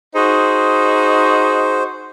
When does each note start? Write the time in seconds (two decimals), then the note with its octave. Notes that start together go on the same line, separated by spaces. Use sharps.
0.15 D#4 F#4 G#4 C5